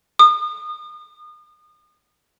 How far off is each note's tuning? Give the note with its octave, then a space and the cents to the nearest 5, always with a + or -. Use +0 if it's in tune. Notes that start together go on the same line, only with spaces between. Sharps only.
D#6 -35